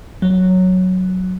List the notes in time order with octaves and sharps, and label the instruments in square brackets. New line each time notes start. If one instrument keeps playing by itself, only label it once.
[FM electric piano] F#3